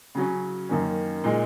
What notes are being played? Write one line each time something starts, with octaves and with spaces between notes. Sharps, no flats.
C#3 F#3 C#4
F#2 D#3 A#3 C#4
A#2 G#3 D#4